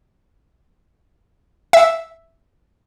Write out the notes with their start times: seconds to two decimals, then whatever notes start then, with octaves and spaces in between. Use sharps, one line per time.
1.73 E5